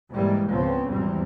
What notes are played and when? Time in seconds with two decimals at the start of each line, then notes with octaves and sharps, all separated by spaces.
0.12 G#2 E3 G3 G#3 A#3
0.49 C#2 G#2 C#3 F3 B3 C4
0.87 G#1 E2 E3 G3 C4